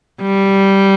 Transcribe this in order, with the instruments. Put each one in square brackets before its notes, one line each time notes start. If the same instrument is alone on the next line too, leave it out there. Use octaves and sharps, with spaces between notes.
[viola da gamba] G3